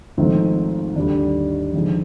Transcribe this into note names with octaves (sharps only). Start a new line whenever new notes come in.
G#1 G#2 F3 A3 C4
D#2 D3 G3 D4
D#2 D3 F3 G#3 D4